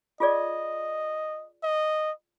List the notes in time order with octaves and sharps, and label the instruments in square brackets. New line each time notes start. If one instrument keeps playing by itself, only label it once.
[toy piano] F4 G#4 D5 [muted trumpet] D#5
[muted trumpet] D#5